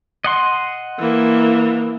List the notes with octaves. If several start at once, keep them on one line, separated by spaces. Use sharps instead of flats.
D#5 F#5 C6
E3 A#3